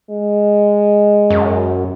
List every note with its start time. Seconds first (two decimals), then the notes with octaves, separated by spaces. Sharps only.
0.10 G#3
1.30 F#2